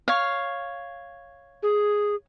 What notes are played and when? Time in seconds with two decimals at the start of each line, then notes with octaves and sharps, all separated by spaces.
0.08 C#5 F5
1.63 G#4